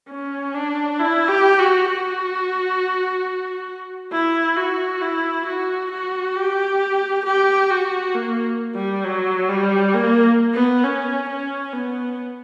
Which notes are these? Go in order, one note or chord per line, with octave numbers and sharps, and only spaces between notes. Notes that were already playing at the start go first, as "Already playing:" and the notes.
C#4
D4
E4
G4
F#4
F#4
E4
F#4
E4
F#4
F#4
G4
G4
F#4
A#3
G3
F#3
G3
A#3
B3
C#4
C#4
B3